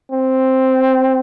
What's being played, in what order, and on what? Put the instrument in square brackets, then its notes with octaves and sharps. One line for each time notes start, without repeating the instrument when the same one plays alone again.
[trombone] C4